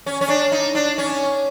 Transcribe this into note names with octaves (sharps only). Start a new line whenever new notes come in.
C#4
C#4
D4
D#4
D4
C#4